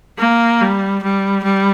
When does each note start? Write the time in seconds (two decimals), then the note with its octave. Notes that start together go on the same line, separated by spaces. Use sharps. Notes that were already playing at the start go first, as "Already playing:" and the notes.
0.18 A#3
0.61 G3
1.03 G3
1.44 G3